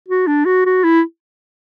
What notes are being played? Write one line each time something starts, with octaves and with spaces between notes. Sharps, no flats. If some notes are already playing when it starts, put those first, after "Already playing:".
F#4
D4
F#4
F#4
E4